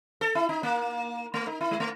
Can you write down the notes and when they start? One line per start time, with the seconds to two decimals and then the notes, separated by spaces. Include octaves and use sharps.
0.21 A4
0.35 E4
0.49 D#4
0.63 A#3
1.34 A3
1.47 D#4
1.61 E4
1.71 G#3
1.80 A3